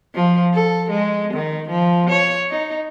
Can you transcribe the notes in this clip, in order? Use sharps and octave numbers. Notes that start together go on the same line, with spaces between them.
F3
A4
G#3
D#3
F3
C#5
D#4